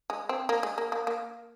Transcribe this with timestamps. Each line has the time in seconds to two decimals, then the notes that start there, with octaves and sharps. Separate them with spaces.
0.10 G#3
0.29 C4
0.49 A#3
0.63 G#3
0.78 A#3
0.92 A#3
1.07 A#3